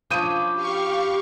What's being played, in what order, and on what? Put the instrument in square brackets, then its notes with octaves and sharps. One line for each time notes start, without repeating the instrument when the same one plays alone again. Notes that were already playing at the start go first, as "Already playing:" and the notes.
[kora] F3 C#4 D4 [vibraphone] B5 D6 [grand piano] D#6 G6 D#7
[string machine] G4 F5 C#6